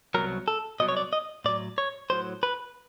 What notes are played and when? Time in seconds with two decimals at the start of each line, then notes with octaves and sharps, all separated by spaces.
0.14 C2 B2 F#3 A#4
0.48 A4
0.80 C2 B2 F#3 D#5
0.88 C#5
0.97 D5
1.13 D#5
1.45 A2 F#3 D5
1.78 C#5
2.10 A2 F#3 C5
2.43 B4